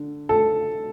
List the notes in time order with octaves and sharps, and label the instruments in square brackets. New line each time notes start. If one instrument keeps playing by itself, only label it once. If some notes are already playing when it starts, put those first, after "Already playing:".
Already playing: [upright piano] D3
A4